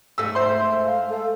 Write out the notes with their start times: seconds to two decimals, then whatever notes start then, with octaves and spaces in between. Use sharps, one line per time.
0.18 G#2 A3 E6
0.35 C5 E5 C6
0.85 F5
1.10 A4